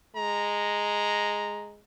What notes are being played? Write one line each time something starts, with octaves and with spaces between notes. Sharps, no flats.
G#3 A#5